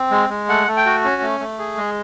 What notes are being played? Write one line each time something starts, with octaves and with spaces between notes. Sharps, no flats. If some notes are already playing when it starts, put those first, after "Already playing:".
Already playing: C4
G#3
G#3
A3 F#5
A3
G5
F#4
C#4
A3
A3
G#4
G#3